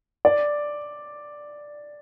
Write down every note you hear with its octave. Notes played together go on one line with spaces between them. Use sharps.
D5